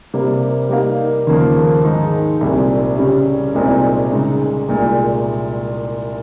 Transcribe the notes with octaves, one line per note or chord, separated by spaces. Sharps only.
C3 G3 A#3
G3 A#3 D#4 A#4 F5
D#2 C#3 F3 A#3
G#2 D#3 G#3 D#4 A#4
C2 A#2 G3 C4
C#3 G3 C#4 G4
C2 A#2 G#3 C4 D#4
C#3 G#3 D#4
C2 A#2 G#3